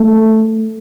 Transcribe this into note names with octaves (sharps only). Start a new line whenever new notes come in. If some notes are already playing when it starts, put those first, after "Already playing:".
Already playing: A3